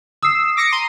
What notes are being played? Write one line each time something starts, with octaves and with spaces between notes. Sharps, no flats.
D#6 E6 C7
D6 A#6 C#7
A#5 C6 D#7